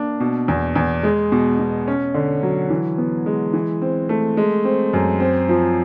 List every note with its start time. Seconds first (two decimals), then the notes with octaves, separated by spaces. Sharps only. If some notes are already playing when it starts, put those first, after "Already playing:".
Already playing: A#3 D4
0.20 B2
0.48 E2
0.76 E2
1.03 G#3
1.32 B2
1.59 B2
1.88 C#4
2.14 D3
2.43 F#3
2.70 E3
2.98 B3
3.26 G#3
3.53 E3
3.82 C4
4.09 A3
4.37 G#3
4.65 C4
4.94 F#2
5.20 C4
5.49 F3